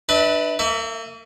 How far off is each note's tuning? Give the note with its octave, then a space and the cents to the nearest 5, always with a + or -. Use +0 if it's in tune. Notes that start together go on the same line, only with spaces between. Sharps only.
D4 +25 B4 +0 E5 -30
A#3 -40 E5 +0